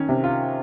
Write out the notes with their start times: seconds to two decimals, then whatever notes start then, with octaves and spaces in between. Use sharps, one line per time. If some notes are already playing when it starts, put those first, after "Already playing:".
Already playing: D#3 C#4
0.09 C3
0.24 F4